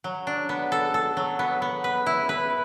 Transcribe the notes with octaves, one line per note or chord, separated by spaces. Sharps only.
F#3
D4
B3
A4
A4
F#3
B3
B3
B4
E4
B4